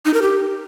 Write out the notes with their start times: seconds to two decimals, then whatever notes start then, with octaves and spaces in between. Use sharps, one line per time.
0.05 D#4
0.14 A#4
0.22 G4